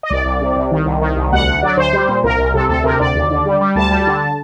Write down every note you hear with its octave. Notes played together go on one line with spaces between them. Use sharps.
D#5
C2 D5
C2
C3
C2
D#3
C2
D#3
C2
D2 F#5
D2
F#3 D5
D2 C5
G3
A#2
C2 A#4
C2
C3 A4
D2 A4
C3 A#4
D2 D5
D#2
D3
G3
G3
D2 A5
G3
D3